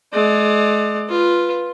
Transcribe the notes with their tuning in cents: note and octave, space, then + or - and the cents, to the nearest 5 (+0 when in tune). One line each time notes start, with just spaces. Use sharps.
G#3 +40 D5 +35
F4 +0 B4 +0